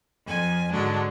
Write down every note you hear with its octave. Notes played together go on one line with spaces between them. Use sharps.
F2 G#5
G#2 D3 F#3 G#3 D4